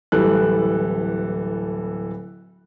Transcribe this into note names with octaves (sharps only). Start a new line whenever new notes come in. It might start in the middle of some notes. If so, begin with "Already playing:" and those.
D1 E3 G3 A4 F#6